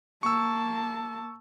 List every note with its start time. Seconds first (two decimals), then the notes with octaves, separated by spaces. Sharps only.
0.23 A#3 A5 C#6 E6